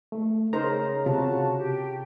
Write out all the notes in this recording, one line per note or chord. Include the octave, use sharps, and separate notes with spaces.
A3
C#3 D#4 A#4 C5 A#5
C3 F4 F#4 A5
G4